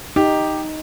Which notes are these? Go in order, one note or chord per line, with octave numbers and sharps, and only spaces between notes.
D#4 G4